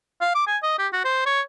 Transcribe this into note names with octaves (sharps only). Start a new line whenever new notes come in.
F5
D6
G#5
D#5
G4
F#4
C5
C#5